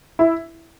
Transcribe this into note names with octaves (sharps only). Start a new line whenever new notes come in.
E4